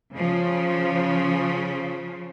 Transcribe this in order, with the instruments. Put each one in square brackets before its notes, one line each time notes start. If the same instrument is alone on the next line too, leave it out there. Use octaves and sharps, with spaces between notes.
[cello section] C#3 F3